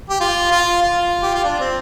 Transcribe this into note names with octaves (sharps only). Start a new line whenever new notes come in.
G4
F4
F4
F4
G4
F4
D4
C4